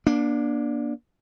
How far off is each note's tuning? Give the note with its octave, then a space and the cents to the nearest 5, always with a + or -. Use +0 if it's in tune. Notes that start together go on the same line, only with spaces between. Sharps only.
A#3 +40 D4 +0